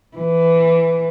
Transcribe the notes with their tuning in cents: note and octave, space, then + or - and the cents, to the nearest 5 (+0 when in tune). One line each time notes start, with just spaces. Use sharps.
E3 +10